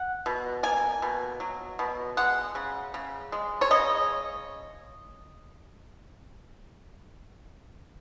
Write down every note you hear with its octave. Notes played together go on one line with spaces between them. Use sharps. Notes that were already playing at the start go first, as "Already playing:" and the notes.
Already playing: F#5
B2
A#3 G#5
B2
F#3
B2
G#3 F#5
C#3
C#3
G#3
C#5
C#3 D#5